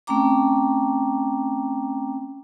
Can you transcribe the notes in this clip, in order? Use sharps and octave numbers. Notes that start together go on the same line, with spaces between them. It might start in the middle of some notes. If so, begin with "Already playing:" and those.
A3 C4 C#4 G5 A#5 D6